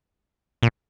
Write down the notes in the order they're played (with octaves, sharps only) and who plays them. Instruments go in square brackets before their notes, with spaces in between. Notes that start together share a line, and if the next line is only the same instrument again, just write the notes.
[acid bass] A#2